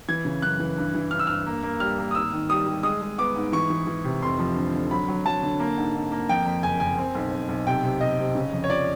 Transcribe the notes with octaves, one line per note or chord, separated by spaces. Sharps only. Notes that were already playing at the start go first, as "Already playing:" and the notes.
E3 G#6
C#3
F#2 F#6
E3
G2
E3
G2 F6
E6
G2 F6
A#3
A#3
G3 F6
A#3
D#6
G#1 E6
D#3
G3 D#6
G3
G#3 D#6
G#3
B3 D6
G#2
E3 C#6
E3
E3
C3
F1 C6
F3
D3
D3
F#3 B5
F#3
F#3 A5
D3
A#3
G#2
G#2
A#3
F2 G5
F2
F#1 G#5
F#1 G#5
C4
B1
C4
B1
C3 G5
C3
C3 D#5
C3
C#3
F2
C#5
F3 D5